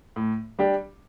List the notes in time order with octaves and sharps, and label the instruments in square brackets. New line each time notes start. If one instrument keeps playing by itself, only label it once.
[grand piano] A2
G3 D4 G4